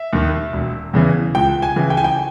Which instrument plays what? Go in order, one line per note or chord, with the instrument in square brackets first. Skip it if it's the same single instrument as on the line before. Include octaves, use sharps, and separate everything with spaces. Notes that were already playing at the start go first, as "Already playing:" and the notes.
Already playing: [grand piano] E5
D#2 D#3
E1
E2 C#3 E3
C#2 G5
G#5
C#3 E3
G5
G#5
G5